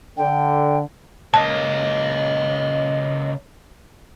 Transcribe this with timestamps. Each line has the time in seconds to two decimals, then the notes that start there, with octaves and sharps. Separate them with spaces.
0.17 D3 G5
1.34 C#2 A#3 C#5 D#5 A5